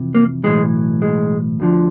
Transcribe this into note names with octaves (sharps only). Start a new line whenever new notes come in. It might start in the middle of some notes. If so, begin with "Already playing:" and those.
Already playing: F2 C3 E3
A#3
B1 A2 E3 G#3
G#3
D2 D3 F3